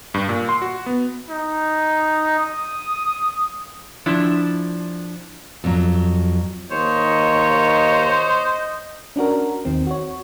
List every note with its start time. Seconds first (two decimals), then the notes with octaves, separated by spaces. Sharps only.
0.14 G2
0.29 A#2
0.49 C6
0.62 F#4
0.86 B3
1.30 D#4
2.39 D#6
4.06 F3 D4 E4
5.64 F2 F#3
6.71 D#2 C5 C#5 D#5
9.16 C#4 D4 F#4 A#4
9.65 D#2 D#3 C4
9.87 F#4 C#5